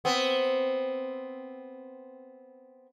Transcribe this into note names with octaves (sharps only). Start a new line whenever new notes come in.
B3 C4